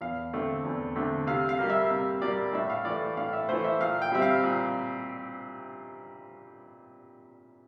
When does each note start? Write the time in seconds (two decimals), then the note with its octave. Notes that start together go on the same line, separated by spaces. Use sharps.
0.01 E2 F5
0.33 D3 A3 C4
0.65 E2
0.95 D3 A3 C4
1.27 C3 F5
1.49 F5
1.59 G3 A#3
1.70 E5
1.91 C3
2.22 G3 A#3 D5
2.53 A2 E5
2.70 F5
2.85 E3 A3 D5
3.17 A2 F5
3.33 E5
3.49 E3 A3 C5
3.64 E5
3.81 A#2 F5
4.02 G5
4.12 G3 C4 E5
4.22 F5
4.43 A#2